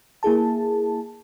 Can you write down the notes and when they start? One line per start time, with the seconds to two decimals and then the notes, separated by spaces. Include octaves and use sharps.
0.23 A#3 E4 G#4 A5